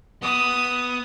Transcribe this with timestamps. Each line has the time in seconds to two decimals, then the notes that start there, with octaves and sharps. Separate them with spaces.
0.22 B3 D#6